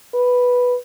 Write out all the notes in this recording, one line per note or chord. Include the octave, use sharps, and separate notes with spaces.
B4